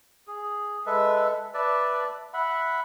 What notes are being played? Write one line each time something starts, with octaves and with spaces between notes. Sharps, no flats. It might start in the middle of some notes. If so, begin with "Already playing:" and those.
G#4
G#3 A4 B4 E5
B4 D5 E5 A5
E5 F#5 B5